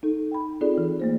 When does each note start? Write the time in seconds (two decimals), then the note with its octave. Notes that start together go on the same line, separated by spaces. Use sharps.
0.03 D#4 A4
0.31 G5 B5
0.61 C4 D#4 F4 G#4 A4 D5
0.78 E3
1.00 A3 A#3 C5